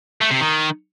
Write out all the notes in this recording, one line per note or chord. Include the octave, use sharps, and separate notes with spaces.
A3
C3
D#3